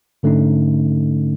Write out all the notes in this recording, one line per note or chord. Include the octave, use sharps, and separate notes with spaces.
G#2 D3 A3 C#4 D#4